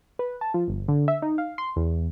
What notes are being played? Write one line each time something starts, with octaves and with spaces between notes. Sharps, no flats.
B4
A5
F3
G1
D3
E5
D#4
F5
C6
E2